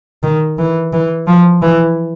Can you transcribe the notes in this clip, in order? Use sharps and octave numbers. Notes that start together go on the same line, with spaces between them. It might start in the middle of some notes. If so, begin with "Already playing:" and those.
D#3
E3
E3
F3
E3